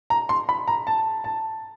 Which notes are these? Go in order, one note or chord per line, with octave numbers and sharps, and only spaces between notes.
A#5
C6
B5
A#5
A5
A5